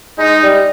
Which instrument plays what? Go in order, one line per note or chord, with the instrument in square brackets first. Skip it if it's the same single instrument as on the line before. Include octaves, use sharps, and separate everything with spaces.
[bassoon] G#3 [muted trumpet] D#4
[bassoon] G3